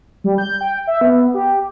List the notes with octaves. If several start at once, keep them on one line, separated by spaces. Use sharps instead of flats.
G3
G6
G5
E5
B3
G4